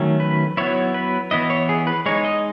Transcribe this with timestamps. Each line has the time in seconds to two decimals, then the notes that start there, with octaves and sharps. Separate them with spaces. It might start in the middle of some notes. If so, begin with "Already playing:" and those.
Already playing: D#3 F#3 A3 C#4
0.20 B4
0.57 F#3 B3 E4 C#5
0.94 B4
1.31 E3 B3 E4 D#5
1.50 C#5
1.69 G#4
1.87 B4
2.06 G#3 D#4 C#5
2.25 D#5